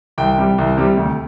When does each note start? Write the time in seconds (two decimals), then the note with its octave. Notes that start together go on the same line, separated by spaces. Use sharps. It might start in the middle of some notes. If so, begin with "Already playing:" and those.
0.18 C2 G5
0.38 C3 G3
0.58 C2
0.77 C3 G3
0.97 D2